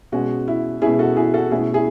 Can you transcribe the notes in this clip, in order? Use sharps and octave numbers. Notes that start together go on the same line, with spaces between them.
B2 G#3 C#4 F#4
E4
B2 G#3 C#4 E4 G#4
F#4 A4
E4 G#4
F#4 A4
B2 A3 C#4 E4 G#4
E4 G#4